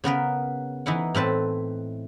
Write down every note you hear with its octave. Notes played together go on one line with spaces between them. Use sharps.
C#3 B3 A#4 B4
E3 D#4 E4 F#5
A2 C4 B4 A5